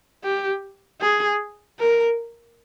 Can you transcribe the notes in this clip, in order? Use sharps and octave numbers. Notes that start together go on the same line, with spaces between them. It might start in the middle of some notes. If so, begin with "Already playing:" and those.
G4
G#4
A#4